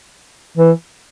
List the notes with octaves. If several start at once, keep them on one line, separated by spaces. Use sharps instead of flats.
E3